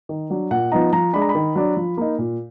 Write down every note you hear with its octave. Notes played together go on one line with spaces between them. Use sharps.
D#3
F#3 D4
A#2 F#5
F3 B3 D#4 A#5
F3 A#5
G#3 D4 B5
A#5
B5
D#3
F#3 D4
F3
A#3 D#4
A#2